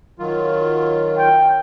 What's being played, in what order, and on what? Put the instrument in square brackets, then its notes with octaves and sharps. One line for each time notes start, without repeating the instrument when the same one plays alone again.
[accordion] D#3 F#3 F4
[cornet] G5